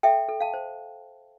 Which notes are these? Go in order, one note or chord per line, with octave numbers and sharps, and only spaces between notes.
A4 E5 G5
A4
F5 A5
C5